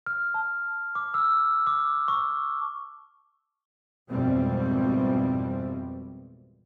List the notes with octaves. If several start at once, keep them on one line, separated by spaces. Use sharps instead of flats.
F6
A5
D6
E6
D6
C#6
G#1 F2 B2 E3 G3 C4